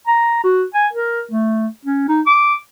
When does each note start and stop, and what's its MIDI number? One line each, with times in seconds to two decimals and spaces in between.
0.07 0.43 82
0.44 0.64 66
0.74 0.87 80
0.93 1.23 70
1.31 1.67 57
1.85 2.05 61
2.08 2.21 63
2.26 2.55 86